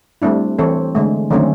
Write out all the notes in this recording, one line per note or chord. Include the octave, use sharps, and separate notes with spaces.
G3 A3 C4 D4 E4
E3 C4 A4 C#5
D3 G#3 A3
D3 D#3 F#3 A3 C4 C#4